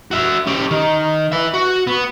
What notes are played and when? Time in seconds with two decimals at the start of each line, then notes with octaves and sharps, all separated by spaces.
0.11 F#4 E5
0.47 C#4 G4
0.71 D#3
1.32 B4 E5
1.54 F#4
1.87 B3